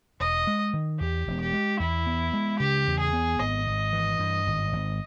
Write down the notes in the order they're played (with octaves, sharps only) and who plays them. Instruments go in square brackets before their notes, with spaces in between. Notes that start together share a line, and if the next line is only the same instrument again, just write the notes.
[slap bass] E1 [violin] D#5
[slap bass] G#3
D#3
[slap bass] E2 [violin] G4
[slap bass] E1
[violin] G4
[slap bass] G#3
[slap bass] E2 [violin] E4
[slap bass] B3
G#3
[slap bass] C#3 [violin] G4
[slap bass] E2
[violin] G#4
[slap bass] B3
[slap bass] G#1 [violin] D#5
[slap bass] G#1
E3
G2
G#1
G#1